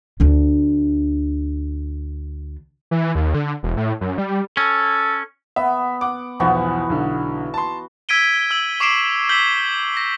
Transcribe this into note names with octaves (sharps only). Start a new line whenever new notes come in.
D2 D4
E3
D#2
D3
E1
A2
F#2
G3
C#4 A4
B3 E5
F#5 D6
B1 E2 E3 F3 B3 F#4
B1 D3
A5 C6
E6 G#6 B6 D7 D#7 G7
E6 F#7
C#6 D6 C7 D7 E7
E6 G6 B6 F#7 G7
A#6